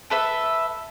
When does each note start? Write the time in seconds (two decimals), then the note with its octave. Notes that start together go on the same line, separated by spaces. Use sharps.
0.10 A4 B4 E5